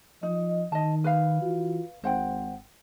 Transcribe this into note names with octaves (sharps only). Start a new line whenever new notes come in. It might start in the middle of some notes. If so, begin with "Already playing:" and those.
F3 D#4 D#5
D#3 D#5 A5
B4 F5
E3 F4 F#4
G#1 C5 F#5 G5